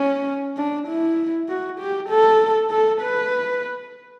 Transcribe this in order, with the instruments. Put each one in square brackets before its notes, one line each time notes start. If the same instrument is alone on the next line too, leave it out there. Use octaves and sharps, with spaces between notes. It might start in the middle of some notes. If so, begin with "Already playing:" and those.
Already playing: [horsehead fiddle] C#4
D4
E4
F#4
G4
A4
A4
B4